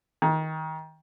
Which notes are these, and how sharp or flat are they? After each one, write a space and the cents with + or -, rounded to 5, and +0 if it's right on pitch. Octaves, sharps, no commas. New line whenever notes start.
D#3 +25